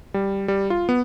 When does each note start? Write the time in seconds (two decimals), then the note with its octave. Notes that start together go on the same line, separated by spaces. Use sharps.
0.14 G3
0.48 G3
0.70 F4
0.89 B3